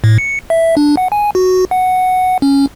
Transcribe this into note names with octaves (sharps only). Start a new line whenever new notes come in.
A2
C#7
E5
D4
F#5
G#5
F#4
F#5
C#4